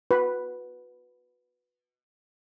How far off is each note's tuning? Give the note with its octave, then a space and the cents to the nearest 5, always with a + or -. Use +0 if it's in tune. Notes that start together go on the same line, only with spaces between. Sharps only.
F#4 -25 B4 +0